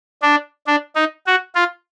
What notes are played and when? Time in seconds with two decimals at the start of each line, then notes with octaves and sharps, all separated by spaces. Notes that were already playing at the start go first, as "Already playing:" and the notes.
0.22 D4
0.67 D4
0.96 D#4
1.26 F#4
1.55 F4